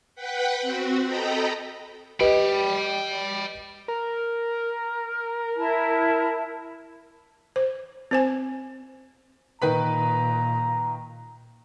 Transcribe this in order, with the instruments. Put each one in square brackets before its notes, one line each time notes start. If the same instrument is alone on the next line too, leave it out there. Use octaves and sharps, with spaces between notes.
[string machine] B4 F#5 G5 B5
C4 F#4
A4 D#5 G5 A#5 B5
[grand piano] G4 B4 D#5 [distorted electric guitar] G5 B5
[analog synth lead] A#4
[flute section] E4 A5
[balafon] C5
C4 C5 G#5
[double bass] A#2 [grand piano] D#3 B4 B5 [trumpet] A#5